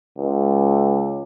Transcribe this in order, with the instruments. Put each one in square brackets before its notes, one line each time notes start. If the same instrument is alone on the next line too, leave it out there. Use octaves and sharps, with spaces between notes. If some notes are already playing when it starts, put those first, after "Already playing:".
[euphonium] C#2